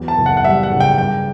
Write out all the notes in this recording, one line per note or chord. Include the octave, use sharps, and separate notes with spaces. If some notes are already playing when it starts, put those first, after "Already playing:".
Already playing: E2 F#3
A5
F#1
F#5
F#5
G3 E5
F#5
C#3
G5
G2 G5